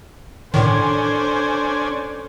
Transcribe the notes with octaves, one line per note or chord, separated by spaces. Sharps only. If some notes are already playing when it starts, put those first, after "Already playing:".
A2 D3 D#3 C#4 D4 C5 C#5 G#5